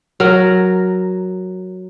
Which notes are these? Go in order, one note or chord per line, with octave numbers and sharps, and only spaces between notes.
F#3 A#4